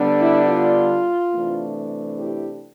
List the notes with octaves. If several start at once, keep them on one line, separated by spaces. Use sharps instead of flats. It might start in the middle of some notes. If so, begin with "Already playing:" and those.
Already playing: D3 G3 B3 D4
E4
F4
C3 E3 A3 D4
E4 G4